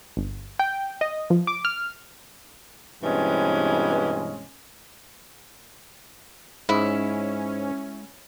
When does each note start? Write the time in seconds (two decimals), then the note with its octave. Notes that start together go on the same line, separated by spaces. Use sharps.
0.17 G1
0.59 G5
1.01 D#5
1.30 F3
1.47 D6
1.65 F6
3.03 G2 B2 E3 G#3 C4 C#4
6.69 G#2 G#3 C#4 E4